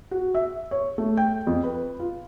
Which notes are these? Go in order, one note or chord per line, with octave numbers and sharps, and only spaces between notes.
F#4
E5
C#5
A3
G5
F2
B4
F4